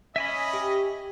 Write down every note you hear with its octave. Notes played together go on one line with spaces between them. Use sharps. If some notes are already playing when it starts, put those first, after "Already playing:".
C#4 D#5 E5 G#5 B5
G4